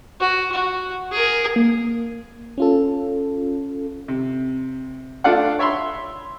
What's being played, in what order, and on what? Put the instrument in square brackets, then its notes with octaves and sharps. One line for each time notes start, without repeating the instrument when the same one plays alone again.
[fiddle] F#4
F#4
G#4 A#4
[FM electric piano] A#3
C#4 F4 A4
[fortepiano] C3
A3 D4 F4 D5 F5 F#5
C#5 E5 B5 C6